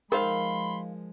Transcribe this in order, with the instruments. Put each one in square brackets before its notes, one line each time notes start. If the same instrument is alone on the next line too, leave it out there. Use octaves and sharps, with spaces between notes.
[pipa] D#3 C5 F5 [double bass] F3 G#3 [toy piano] A#4 [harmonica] B5 C6